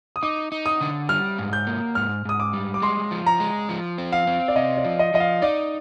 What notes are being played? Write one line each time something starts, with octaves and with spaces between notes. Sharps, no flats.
D#6
D#4 D6
D#4
D#6
D3
G3 F6
G#2
G6
A#3
G#2 F6
G#2 D#6
D6
G3
D6
G#3 C6
F3
A#5
G#3
F3
C4
F5
C4
D5
C3 D#5
D5
F3
D#5
F3 D#5
F5
D#4 D5